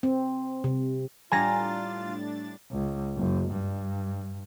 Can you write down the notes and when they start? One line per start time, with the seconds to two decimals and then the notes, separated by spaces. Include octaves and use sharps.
0.03 C4
0.64 C3
1.32 A2 G3 D4 F4 G#5 A#5 A6 A#6
2.72 C#2
3.17 F#1
3.53 G2